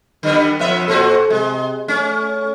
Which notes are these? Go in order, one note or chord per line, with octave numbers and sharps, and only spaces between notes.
D3 G3 B3
F2 B3 E5
A#2 C4 F#4 A4
C3 G#3
A3 C#4